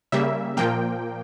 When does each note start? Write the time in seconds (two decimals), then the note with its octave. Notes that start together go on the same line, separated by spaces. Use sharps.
0.12 C#3 G3 A#3 E5
0.57 A#2 F3 A#3 G5